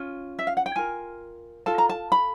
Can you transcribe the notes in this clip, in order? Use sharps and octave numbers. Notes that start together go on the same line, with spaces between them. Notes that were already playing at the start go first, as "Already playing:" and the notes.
Already playing: C#4 F4
E5
F5
F#5
G5
F4 A#4 G#5
F4 A4 A5
A#5
A5
B5